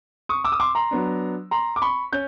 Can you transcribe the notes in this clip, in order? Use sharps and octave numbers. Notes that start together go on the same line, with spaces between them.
C#6 D#6
D6 E6
D#6
C6 D6
A#5 C6
F#3 B3 D4
A#5 C6
D6
B5 C#6
C#4 G6